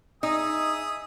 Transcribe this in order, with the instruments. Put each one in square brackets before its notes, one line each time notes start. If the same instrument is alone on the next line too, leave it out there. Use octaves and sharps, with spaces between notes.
[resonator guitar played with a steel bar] D#4 [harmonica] G#4 E5 D#6